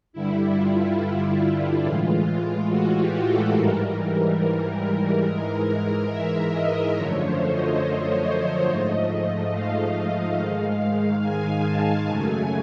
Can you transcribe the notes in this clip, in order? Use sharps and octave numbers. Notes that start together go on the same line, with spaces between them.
G2 D3 G3 E4
F4
F4
A2 E3 G#3
F#4
G4
A4
G#2 E3 G3 A#4
A#4
G#2 E3 G#3
E5
D#5
F#2 D3 F3 A3 C#5
C5
D#5
G#2 F3 A3
F5
G#2 D#3 G#3
G#5
A5
F#2 C#3 F#3 A3 G#5